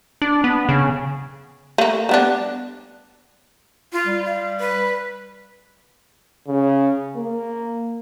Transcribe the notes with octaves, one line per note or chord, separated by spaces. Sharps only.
D4
B3
C#3
A3 A#3
G3 B3 D4
F4
G3
F5
B4
C#3
A#3